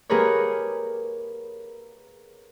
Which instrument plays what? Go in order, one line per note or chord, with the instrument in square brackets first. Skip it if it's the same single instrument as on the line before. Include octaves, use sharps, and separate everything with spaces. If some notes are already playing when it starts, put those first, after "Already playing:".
[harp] A#3 G4 G#4 A#4 B4 C#5